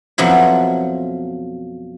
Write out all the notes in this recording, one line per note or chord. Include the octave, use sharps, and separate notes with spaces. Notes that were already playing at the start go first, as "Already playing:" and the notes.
F2 B2 F3 F#3 E4